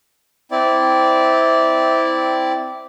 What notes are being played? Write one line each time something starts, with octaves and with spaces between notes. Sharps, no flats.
C4 E4 D5